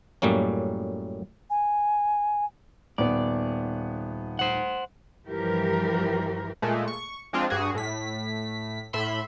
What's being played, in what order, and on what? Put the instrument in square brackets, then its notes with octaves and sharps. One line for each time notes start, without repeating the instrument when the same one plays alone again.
[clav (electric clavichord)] F#2 A2 G3 A#3 C#4
[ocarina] G#5
[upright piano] D#1 B3 [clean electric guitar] D5
[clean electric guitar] C5 F#5
[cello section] G2 E3 F3 G4 A#4
[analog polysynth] A#2 G#3 A3
C#6
F3 G#3 C4 D4 F4
G2 F#4 G#4
A2 B6
A2 E5 B5 C6